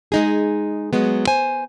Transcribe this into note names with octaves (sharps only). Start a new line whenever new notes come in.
G#3 D#4 G#4
F#3 G#3 B3
C5 G#5